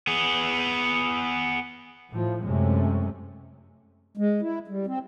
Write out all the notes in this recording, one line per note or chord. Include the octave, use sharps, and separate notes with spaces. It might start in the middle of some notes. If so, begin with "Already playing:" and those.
B3 G#4
A2 F3
F#2 C3 G#3 A3 C#4
G#3
E4
G3
C4